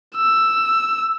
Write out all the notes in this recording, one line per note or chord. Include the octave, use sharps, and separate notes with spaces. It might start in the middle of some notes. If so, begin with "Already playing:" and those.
E6